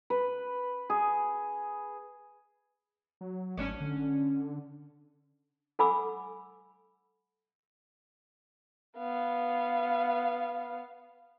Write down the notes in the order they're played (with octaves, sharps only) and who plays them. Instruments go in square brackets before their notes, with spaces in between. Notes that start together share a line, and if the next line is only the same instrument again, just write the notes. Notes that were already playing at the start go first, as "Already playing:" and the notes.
[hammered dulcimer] B4
G#4
[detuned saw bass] F#3
[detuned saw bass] G#1 [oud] C#4 D4 C#5
[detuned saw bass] D3
[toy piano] A4 F#5 G#5 B5 D6 E6
[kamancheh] B3 F5